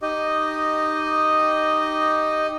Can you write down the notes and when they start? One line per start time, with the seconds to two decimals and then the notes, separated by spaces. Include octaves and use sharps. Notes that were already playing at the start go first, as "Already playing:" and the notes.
0.02 D#4 G4 D#5